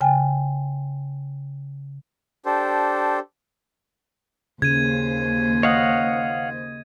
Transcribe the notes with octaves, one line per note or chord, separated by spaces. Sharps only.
C#3 G5 G#5
D4 G4 A4 C5
D#2 C#3 C5 G#6 D#7
C#5 D#5 F5 F#5